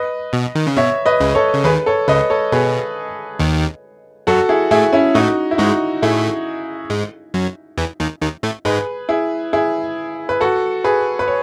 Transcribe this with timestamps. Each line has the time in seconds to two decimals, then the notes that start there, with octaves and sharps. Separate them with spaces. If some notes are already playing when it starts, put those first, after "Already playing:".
Already playing: B4 D#5
0.33 B2
0.55 D#3
0.67 C#3
0.77 B2 C#5 E5
1.06 B4 D#5
1.20 C#2 C#3
1.35 A4 C#5
1.54 C#3
1.64 D#2 D#3 G#4 B4
1.86 A4 C#5
2.08 C#2 C#3 B4 D#5
2.30 A4 C#5
2.52 B2 G#4 B4
3.39 D#2 D#3
4.27 F#2 F#3 F#4 A4
4.49 E4 G#4
4.71 A2 A3 E4 G#4
4.93 C#4 E4
5.15 A2 A3 D#4 F#4
5.51 E4
5.58 G#2 G#3 D#4 F#4
6.02 A2 A3 E4 G#4
6.90 G#2 G#3
7.34 F#2 F#3
7.78 E2 E3
8.00 D#2 D#3
8.21 D#2 D#3
8.43 A2 A3
8.65 G#2 G#3 G#4 B4
9.09 E4 G#4
9.53 E4 G#4
10.29 B4
10.41 F#4 A4
10.84 G#4 B4
11.19 B4
11.28 C#5